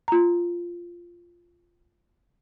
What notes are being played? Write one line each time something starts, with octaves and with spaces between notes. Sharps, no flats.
F4 A#5